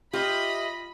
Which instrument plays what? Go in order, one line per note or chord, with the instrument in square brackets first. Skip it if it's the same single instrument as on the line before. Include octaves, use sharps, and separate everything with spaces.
[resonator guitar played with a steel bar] F4 [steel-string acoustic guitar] G4 E5 [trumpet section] D#5 [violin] B5